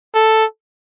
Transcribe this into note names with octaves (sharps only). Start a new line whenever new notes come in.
A4